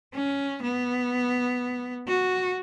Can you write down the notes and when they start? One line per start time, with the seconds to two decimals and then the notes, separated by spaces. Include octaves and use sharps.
0.13 C#4
0.62 B3
2.07 F#4